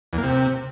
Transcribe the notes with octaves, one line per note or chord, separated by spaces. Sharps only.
E2
A#3
C3